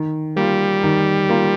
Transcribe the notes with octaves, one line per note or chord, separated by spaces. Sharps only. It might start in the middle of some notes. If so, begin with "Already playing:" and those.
Already playing: D#3
G3 A#3 F4
D#3
A#3 F4